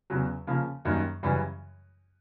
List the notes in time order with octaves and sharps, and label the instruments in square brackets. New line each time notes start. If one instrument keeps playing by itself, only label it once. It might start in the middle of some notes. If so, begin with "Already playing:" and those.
[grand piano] E2 C#3 F#3
C#3 F3 A#3
F#2 D#3 G3 A#3
F#2 C#3 E3 G3